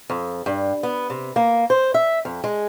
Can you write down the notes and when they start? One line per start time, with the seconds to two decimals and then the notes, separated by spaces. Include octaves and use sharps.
0.10 F2
0.46 G2
0.83 B3
1.10 C3
1.36 A#3
1.70 C5
1.94 E5
2.25 F2
2.44 G#3